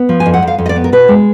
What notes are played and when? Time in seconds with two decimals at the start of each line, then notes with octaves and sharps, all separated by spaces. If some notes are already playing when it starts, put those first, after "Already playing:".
Already playing: B3
0.09 F3
0.20 G#5
0.26 F2
0.34 F#5
0.43 F2 F5
0.58 F2
0.66 D#5
0.69 D5
0.76 B3
0.84 A#4
0.92 B2 B4
1.08 G#3